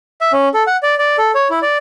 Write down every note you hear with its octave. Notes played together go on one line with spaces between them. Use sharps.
E5
C#4
A4
F#5
D5
D5
A4
C#5
E4
D5